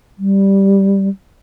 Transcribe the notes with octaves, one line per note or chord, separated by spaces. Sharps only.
G3